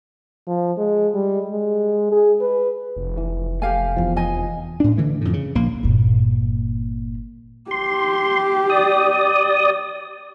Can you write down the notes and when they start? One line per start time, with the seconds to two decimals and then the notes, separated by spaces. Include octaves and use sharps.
0.47 F3
0.77 G#3
1.14 G3
1.51 G#3
2.12 G#4
2.41 B4
2.96 F1
3.17 E3
3.62 A3 G4 F5 G#5
3.97 E2 F3
4.16 D#5 G#5
4.80 A2 D4
4.97 D3 E3 A3
5.21 F2 A2
5.33 C#3
5.55 A#1 A#3
5.83 G1 A#2
7.71 G4 C6
8.70 D5 D#6